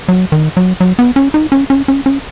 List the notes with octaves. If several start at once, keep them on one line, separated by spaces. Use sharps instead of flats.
F#3
D#3
F#3
F#3
B3
C#4
D#4
C#4
C#4
C#4
C#4